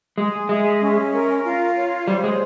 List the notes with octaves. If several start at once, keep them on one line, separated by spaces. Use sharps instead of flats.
G#3 G#4
G#3 E5
C#4
A#4
F4
C#5
G3 C5
G#3